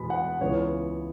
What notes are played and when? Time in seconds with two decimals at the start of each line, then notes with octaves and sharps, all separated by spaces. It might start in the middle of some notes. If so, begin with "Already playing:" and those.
Already playing: E2 B2 G#3 B3 B5
0.10 F#5
0.40 C#2 C#3 E3 B3 C#5